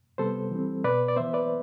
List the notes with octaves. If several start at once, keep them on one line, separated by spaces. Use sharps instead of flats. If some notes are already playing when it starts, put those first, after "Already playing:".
C3 G3 B3 A4 C5
E3 G3 C4
B2 B3 B4 D5
D5
E3 B3 C5 E5
B4 D5